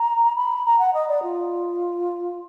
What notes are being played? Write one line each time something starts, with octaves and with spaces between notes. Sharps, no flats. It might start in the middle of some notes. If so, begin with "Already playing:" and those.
Already playing: A#5
B5
A#5
F#5
D#5
D5
F4